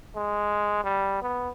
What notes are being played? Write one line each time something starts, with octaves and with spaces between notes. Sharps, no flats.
G#3
G3
B3